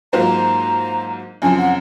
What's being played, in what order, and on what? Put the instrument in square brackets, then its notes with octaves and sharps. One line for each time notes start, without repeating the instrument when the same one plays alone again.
[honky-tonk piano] G#2 F#3 A#3 F4 C5 [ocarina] A#5
[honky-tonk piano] F#2 C#3 F3 C4 [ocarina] G#5
[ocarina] F#5